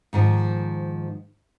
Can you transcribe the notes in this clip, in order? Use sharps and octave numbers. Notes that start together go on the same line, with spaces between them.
G#2 D#3 F3